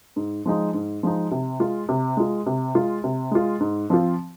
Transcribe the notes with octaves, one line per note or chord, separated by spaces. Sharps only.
G#2
F3 G#3 D#4
G#2
F3 G#3 D#4
C3
G#3 F4
C3
G#3 F4
C3
G#3 F4
C3
G#3 F4
G#2
F3 C4 F4